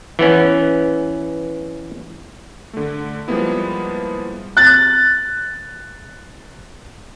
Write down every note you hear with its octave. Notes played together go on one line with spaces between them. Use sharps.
E3 B3 C#4
D3 A3
F3 G3 G#3 A#3 B3 E4
F#6 A6